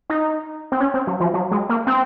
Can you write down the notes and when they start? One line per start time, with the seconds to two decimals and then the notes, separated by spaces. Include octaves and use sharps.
0.10 D#4
0.72 C4
0.80 C#4
0.94 C4
1.07 F#3
1.20 F3
1.34 F#3
1.51 G#3
1.69 A#3
1.87 C4